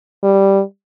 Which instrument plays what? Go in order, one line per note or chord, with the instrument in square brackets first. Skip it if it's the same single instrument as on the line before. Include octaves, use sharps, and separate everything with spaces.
[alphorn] G3